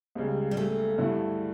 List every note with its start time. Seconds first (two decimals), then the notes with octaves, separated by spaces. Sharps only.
0.15 C#2 C#3 G3
0.51 G3
0.57 A3
0.98 G2 D3 A3 E4